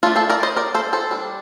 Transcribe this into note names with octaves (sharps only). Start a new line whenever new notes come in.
A3 D4 F4 A4
A4 C5
A#4 D5
C5 D#5
A#4 D5
A4 C5
A4 C5
G3 D4